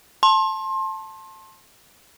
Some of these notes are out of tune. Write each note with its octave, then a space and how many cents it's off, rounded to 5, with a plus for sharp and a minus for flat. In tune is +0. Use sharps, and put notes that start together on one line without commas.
A5 +0 C6 +30